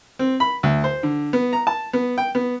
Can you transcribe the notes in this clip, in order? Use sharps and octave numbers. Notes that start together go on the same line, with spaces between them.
C4
B5
D2
C5
D3
B3
A#5
A5
B3
G5
B3